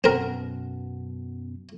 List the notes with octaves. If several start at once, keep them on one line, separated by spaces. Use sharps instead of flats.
F#2 B2 B3 C4 A#4